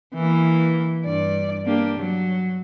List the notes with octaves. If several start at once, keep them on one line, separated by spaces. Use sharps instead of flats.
E3 A#3
G2 D5
A#3 D4 G4
F#3